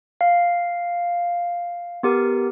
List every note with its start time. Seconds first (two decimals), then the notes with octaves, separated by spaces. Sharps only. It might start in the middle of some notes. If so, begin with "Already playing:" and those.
0.21 F5
2.03 B3 G4 A#4